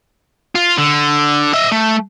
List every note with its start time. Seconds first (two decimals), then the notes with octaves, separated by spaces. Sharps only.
0.55 F4
0.78 D3
1.53 D#5 E5
1.72 A3